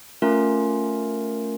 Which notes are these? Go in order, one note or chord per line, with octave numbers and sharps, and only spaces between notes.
A3 C#4 F4 A#4